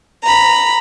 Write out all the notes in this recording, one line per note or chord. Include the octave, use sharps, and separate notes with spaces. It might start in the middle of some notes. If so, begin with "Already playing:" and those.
A#5 B5